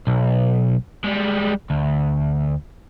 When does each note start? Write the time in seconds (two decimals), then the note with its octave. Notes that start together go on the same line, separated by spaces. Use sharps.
0.07 B1
1.04 G3 G#3
1.70 D2